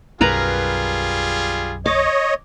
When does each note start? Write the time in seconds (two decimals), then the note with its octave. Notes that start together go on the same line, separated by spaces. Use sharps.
0.21 B1 F#2 G3 F4 G#4 A#4 B4 A#5
1.86 C#5 D#5 D6